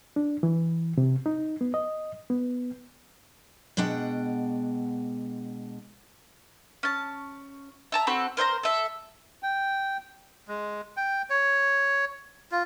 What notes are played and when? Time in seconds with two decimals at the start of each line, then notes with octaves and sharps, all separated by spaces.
0.16 D4
0.43 E3
0.98 C3
1.26 D#4
1.61 B3
1.74 D#5
2.30 B3
3.77 B2 G#3 D4 F#5 G5
6.83 C#4 A5
7.92 E5 A5 A#5
8.07 C4 F#4 A4 B5
8.37 A#4 C5 E5 A#5
8.63 A4 E5
9.43 G5
10.48 G#3
10.97 G5
11.30 C#5
12.52 F4